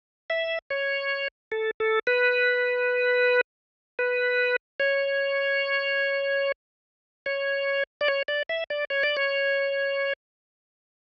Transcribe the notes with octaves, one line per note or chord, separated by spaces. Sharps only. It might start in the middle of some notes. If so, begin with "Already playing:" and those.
E5
C#5
A4
A4
B4
B4
C#5
C#5
D5
C#5
D5
E5
D5
C#5
D5
C#5